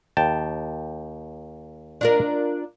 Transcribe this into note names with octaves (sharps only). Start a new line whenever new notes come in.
D#2 G5 A5
D4 F4 A#4